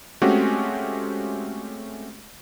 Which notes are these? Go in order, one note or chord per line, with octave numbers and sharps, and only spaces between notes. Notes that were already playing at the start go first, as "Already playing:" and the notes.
G#3 A3 C4 C#4 F#4 G4